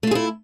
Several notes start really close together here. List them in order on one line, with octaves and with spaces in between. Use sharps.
A3 F4 G#4 E4